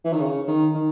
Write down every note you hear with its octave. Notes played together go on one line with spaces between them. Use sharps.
E3
D#3
C#3
D#3
D#3